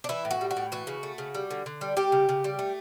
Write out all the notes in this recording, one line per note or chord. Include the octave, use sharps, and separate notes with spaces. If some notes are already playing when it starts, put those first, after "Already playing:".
D4
E3 E4
A2
F#4
G3
F#4
A2
E3 F#4
C#3
A3
C#3
G3
D3
D3
G3
G3 G4
C#3
C#3
G3
A3